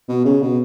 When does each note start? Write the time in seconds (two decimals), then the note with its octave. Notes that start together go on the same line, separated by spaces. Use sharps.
0.09 B2
0.25 C#3
0.42 B2